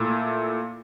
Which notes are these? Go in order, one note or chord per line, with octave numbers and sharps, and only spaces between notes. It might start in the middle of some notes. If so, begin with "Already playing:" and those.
Already playing: A#2 A3 E4 A4